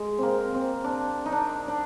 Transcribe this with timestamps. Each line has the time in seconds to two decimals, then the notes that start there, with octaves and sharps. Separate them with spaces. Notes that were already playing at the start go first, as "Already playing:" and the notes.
Already playing: G#3
0.18 A#3 C4
0.54 C4
0.84 D4
1.26 D#4
1.32 D4
1.68 D4